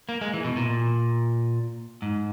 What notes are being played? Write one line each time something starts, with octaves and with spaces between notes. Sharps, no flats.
A#3
G#3
E3
B2
A#2
G#2